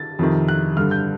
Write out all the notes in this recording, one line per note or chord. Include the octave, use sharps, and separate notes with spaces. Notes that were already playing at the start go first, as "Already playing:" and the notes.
Already playing: A6
F2 C3 D#3
F#6
G2 D3 F6
G6